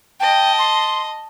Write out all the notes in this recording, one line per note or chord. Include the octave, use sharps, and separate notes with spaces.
D#5 G5 A5
C6